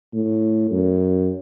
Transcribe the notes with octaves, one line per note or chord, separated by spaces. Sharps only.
A2
F#2